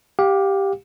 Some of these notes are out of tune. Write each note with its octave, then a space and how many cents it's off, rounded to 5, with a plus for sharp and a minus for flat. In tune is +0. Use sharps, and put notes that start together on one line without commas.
G4 +0 F5 +30